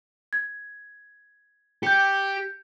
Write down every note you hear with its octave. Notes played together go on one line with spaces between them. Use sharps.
G#6
G4 G6 C#7